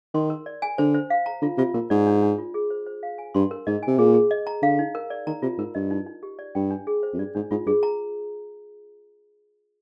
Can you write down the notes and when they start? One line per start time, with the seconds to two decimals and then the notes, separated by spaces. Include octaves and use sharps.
0.14 D#3 C6
0.30 A#4
0.46 D5
0.62 G#5
0.78 D3 C5
0.95 C5
1.10 F5
1.26 A#5
1.42 D3 F4
1.58 C3 F4
1.74 A#2 A#4
1.90 G#2 D5
2.07 D4
2.23 D4
2.38 F4
2.54 G#4
2.70 C5
2.86 C5
3.03 F5
3.18 G#5
3.34 G2 C6
3.51 A#4
3.67 G#2 D#5
3.83 G#5
3.88 C3
3.98 A#2 G#4
4.14 G#4
4.31 D#5
4.47 A#5
4.62 D3 F5
4.79 D#4
4.95 A#4
5.10 D5
5.27 D#3 A#5
5.42 C3 F4
5.58 G#2 A#4
5.75 G2 D#5
5.91 D#4
6.07 D#4
6.23 G4
6.39 D5
6.55 G2 G5
6.70 D4
6.87 G#4
7.03 C5
7.13 F2
7.19 G2 D5
7.35 G#2 D4
7.51 G#2 F4
7.66 G2 G#4
7.83 A#5